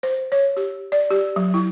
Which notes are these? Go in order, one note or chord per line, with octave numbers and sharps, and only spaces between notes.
C5
C#5
G4
D5
G4
F#3
E4